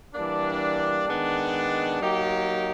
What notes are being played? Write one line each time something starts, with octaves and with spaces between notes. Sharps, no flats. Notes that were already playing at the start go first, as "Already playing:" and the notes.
E3 G3 A#3 D4
D#3 G#3 B3 D4
F#3 A#3 D#4 G4